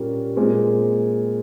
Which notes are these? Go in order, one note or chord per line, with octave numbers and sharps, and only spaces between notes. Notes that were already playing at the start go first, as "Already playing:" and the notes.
Already playing: A#2 G3 A#3 C#4
A#2 G#3 C4